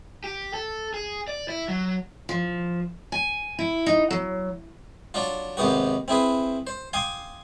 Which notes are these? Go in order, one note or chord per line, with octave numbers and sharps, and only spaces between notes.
G4
A4
G#4
D5
E4
F#3
F3
G#5
E4
D#4
F#3
F#3 D4 F4
D#2 G#2 C3 B3 F#4
C4 E4 G#4 B4
C5
F5 G5 G#5 C6 D6 D#6